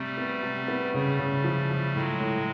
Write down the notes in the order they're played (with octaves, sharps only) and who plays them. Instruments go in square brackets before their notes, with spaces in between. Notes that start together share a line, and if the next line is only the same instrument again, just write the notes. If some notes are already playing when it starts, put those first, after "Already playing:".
Already playing: [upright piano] C3 [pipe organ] G3 A3
[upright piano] B3
C3
B3
[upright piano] C#3 [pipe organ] G3 A3
[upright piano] C#3
F3
F3
[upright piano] A2 [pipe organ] F#3 G#3
[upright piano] A2